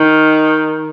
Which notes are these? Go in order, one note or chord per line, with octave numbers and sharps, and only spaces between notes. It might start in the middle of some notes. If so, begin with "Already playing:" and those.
Already playing: D#3